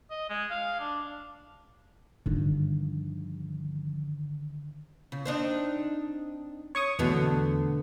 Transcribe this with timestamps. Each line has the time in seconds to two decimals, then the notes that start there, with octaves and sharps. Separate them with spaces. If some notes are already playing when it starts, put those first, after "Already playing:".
0.11 D#5
0.30 G#3
0.51 F5
0.80 D4
2.26 G2 D3 D#3 F3
5.12 C#3
5.26 C4 D4 D#4
6.75 C#5 C#6 D#6
6.99 E2 B2 D3 A3 B3